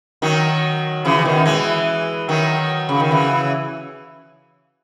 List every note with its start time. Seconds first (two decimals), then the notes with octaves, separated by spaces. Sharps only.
0.22 D#3 F#3
1.05 C#3 E3
1.19 E3
1.25 B2 D#3
1.46 E3 G#3
2.28 D#3 F#3
2.89 C#3
3.00 D#3
3.11 C#3 E3